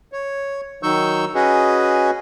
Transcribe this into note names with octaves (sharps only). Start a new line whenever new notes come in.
C#5
D#3 F#3 D#4 C#6 E6 G6
C#4 F#4 G#4 B4 D#5